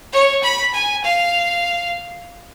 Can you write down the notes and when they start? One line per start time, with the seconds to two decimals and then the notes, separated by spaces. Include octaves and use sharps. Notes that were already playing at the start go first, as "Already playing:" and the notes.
0.12 C#5
0.43 B5
0.74 G#5
1.03 F5